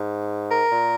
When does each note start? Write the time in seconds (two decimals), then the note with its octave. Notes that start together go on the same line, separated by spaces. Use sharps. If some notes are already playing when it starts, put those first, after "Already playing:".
Already playing: G#2
0.51 A#4
0.72 A#2